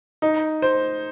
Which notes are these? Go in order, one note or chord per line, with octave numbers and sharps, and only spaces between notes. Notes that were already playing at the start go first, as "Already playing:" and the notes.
D#4
C5